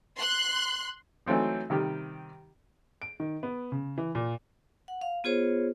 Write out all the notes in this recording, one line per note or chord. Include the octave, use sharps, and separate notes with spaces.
C6 F#6
E3 F#3 A3 C4 D#4
C3 D#3 G3 G4
D7
D#3
B3
C#3
E3
A#2
F#5
F5
B3 F4 G#4 C5 C#5